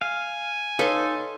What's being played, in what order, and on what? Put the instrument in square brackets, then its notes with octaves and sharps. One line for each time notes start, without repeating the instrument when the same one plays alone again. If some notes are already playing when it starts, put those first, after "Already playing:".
[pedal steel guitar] F5 [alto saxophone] G#5
[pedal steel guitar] D#4 [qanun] A4 C6 [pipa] B4 C#5 F5